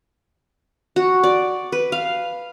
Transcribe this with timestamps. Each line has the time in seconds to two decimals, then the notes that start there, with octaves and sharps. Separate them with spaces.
0.96 F#4
1.23 D5
1.72 B4
1.92 F5